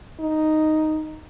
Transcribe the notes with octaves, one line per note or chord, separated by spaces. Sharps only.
D#4